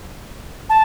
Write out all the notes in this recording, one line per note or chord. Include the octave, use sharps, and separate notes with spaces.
A5